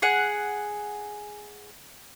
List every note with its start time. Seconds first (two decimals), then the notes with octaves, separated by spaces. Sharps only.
0.02 G#4 F#5